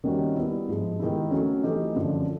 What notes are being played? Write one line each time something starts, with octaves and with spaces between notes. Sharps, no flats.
D#3 G3 A#3 C#4 F#4
G3 B3 E4
G#2 F3 G#3
D#3 G#3 B3 E4 G4
F#3 A3 C#4
E3 A3 C4 D#4 G4
F#2 D3 F3